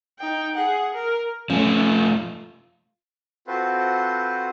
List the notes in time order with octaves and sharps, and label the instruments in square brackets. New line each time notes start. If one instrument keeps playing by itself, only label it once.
[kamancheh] D#4 G5
G#4 F#5
A#4
[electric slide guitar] F3 A3 [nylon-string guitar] C#4
[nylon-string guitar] F4
[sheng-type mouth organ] C4 F4 F#4 A4 B4 C5